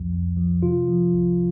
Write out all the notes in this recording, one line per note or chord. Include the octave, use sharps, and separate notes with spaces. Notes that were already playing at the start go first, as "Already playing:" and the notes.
Already playing: C2 F2 F3
F2
F3
C3 F4
F3
C2